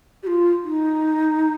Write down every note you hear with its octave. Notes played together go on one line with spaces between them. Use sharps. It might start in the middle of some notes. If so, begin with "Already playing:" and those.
G4
F4
D#4